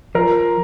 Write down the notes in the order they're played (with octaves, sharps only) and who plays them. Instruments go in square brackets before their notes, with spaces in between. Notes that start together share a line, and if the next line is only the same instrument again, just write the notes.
[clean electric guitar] F3 [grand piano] A#4